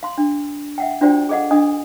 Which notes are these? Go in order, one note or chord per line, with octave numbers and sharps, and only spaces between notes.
F5 C6
D4
E5 F#5 G5
D4 F4 F#4 C5 D5 G5
G#4 A4 D#5 F5 F#5
D4 D#5 G#5 D#6